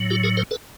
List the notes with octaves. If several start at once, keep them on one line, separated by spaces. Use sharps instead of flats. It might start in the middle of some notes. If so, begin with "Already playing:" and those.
Already playing: A2 F#3
F4 G4
G#4 A#4
A#4 C5
A4 B4